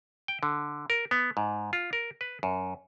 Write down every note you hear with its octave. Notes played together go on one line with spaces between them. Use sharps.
G5
D3
A#4
B3
G#2
F4
A#4
B4
F#2